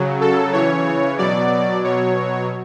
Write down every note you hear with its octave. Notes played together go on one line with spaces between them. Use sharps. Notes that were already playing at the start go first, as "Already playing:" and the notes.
Already playing: C#3 F#3
A4
C#3 E3 C#5
B2 F#3 D5
B2 F#3 C#5